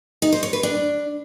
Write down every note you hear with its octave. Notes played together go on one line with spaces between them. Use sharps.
D#4
C5
C#5
B4
D4